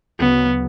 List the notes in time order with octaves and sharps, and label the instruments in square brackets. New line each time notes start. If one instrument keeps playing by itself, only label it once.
[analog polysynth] D2 C#3 F#3 [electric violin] B3